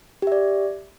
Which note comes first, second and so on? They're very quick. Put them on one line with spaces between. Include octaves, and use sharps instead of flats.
G4 E5 D5